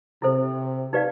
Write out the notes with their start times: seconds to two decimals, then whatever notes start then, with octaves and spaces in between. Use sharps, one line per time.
0.22 C3 E4 A4 C5
0.93 D#4 G4 B4 D5 F5